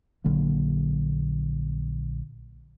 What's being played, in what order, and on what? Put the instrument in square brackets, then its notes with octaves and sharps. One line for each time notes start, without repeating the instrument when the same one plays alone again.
[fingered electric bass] A#1 D3 F#3 A#3